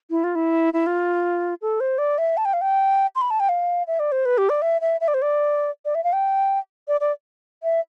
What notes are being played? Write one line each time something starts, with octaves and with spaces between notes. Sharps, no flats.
E4
F4
E4
E4
F4
A4
C5
D5
E5
A5
G5
F5
G5
C6
B5
A5
G5
F5
E5
D5
C5
B4
G4
D5
E5
E5
E5
D5
C5
D5
D5
E5
F5
G5
D5
D5
E5